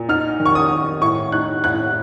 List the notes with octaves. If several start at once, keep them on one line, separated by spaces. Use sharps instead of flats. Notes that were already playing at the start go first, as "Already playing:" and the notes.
Already playing: A#2
D#4 F6
D#3
C#6
D#6
D#3
A2 C#6
D#4 F#6
A2 F#6